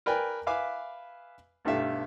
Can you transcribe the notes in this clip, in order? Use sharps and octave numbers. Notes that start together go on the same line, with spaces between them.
A#4 B4 D5 G5 G#5
B4 E5 F5 G#5 D6
B1 G2 A3 G4 E5 F5